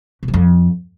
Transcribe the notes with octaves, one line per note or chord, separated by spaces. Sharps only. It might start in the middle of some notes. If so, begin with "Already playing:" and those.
B2
F3
F2